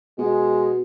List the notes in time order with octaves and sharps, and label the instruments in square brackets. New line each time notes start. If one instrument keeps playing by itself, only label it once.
[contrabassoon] B2 [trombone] G#3